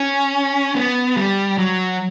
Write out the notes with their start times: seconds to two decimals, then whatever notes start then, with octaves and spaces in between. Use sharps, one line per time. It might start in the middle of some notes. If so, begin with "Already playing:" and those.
Already playing: C#4
0.75 B3
1.16 G3
1.58 F#3